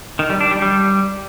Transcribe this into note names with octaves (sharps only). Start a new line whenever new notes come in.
D#3
G3
D4
G3
G3